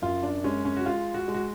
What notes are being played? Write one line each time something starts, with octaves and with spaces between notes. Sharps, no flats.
F#2 F4
D4
G#3 C#4
C#4
F#4
G#3 F4
F#4
G#3
F#4